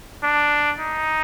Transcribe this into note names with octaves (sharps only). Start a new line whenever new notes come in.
D4
D#4